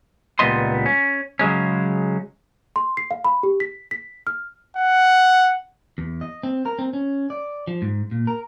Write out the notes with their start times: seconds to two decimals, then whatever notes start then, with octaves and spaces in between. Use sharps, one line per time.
0.39 C#2 A#2 G3 B3 D#5 C6
0.86 C#4
1.39 C#3 F#3 G#3 C#4
2.76 C6
2.97 C7
3.11 F5
3.25 B5
3.43 G4
3.60 B6
3.91 B6
4.27 F6
4.77 F#5
5.98 E2
6.21 D#5
6.43 C4
6.66 A#4
6.79 C4
6.93 C#4
7.30 D5
7.67 F3
7.82 G#2
8.11 A#2
8.27 A#4